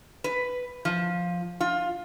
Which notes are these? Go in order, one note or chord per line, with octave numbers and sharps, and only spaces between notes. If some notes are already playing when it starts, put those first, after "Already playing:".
B4
F3
F4